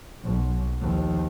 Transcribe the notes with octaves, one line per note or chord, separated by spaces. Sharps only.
B1
D#2 F3